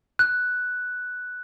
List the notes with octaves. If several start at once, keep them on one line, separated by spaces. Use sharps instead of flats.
F#6